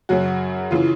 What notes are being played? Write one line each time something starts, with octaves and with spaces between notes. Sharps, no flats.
F#2 C#3 F#3 F#4
C#3 E3 F4